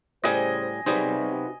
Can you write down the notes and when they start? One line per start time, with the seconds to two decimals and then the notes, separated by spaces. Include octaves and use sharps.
0.24 A2 C#3 G3 C5 D#5 G#5
0.86 C3 G3 D#4 F#4 G#4 B4 C5